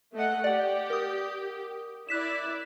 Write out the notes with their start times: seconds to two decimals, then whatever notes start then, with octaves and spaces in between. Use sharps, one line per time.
0.14 A3 D#5 F#5
0.44 G4 D5 F#5
0.90 A#4 D#6
2.09 E4 D5 F#6 B6 E7